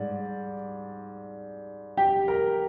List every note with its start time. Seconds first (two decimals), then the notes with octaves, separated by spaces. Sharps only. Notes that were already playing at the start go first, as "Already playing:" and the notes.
Already playing: G#2 G3 D5
1.97 G4 G5
2.28 A#4 A#5